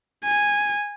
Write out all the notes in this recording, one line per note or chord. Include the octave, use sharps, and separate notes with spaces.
G#5